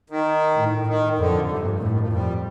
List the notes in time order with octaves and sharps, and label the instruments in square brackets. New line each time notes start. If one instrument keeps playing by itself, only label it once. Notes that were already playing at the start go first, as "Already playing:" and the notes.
[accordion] D#3
[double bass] A2
[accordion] D#3
[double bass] F2 [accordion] D3
[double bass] G2 [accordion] C3
[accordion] A#2
G2
[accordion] F2 [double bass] A2
[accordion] D#3
F3
[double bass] F2 [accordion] G3